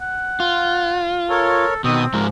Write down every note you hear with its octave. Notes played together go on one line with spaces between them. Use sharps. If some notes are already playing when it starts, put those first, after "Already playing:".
F#5
F4
A4 A#4 C#5
B2 D#3 C4 D#6
G#2 F3 G#3 A#4